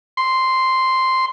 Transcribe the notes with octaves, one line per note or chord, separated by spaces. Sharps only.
C6